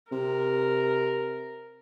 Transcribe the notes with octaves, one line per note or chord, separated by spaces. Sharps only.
C3 A#4